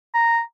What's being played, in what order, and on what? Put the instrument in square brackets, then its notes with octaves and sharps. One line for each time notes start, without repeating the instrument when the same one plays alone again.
[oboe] A#5